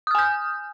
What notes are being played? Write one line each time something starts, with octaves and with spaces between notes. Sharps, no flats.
G#5 D#6 F6 G6